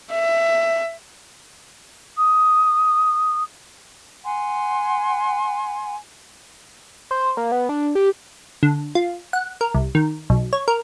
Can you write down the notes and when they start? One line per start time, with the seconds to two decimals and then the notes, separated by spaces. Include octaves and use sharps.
0.11 E5
2.17 D#6
4.24 F#5 G#5 C6
7.11 C5
7.37 A#3
7.52 B3
7.69 D4
7.95 G4
8.63 D3
8.95 F4
9.33 F#5
9.61 A#4
9.75 C2
9.95 D#3
10.30 B1
10.53 C#5
10.68 A#4